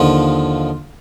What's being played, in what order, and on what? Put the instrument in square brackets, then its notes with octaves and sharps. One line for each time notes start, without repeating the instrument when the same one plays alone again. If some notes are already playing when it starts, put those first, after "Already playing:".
Already playing: [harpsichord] D#2 D3 F3 F4